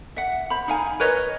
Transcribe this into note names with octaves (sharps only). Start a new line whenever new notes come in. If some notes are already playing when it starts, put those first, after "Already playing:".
E5 F#5
C5 B5
D#4 F5 G#5
A#4 B4 C#5 D#5